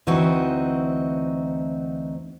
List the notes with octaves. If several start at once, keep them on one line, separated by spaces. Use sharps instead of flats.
D2 E3 C4 D#4 F#4